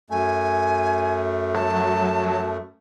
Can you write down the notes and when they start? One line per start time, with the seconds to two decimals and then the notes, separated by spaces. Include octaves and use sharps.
0.10 F#2 A3 G#5
1.54 F#3 A5